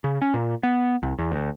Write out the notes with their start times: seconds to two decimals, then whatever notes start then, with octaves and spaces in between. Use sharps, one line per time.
0.04 C#3
0.22 C#4
0.34 A#2
0.63 B3
1.03 C2
1.19 E2
1.32 D2